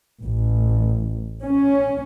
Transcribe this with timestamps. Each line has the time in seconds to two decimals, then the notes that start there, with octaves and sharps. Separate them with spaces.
0.22 A1
1.43 C#4